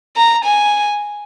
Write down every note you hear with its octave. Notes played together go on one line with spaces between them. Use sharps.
A#5
G#5